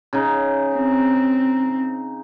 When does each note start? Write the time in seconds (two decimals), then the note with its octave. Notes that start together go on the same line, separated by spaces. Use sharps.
0.13 C#3 D#4
0.75 C4